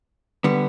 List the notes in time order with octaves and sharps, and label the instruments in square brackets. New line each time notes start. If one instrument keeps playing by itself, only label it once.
[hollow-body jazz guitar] D3 G3 B3